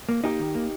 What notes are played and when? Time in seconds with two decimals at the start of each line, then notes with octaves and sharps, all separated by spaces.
0.09 A#3
0.24 A#3 D#4 G4
0.40 D#3
0.55 A#3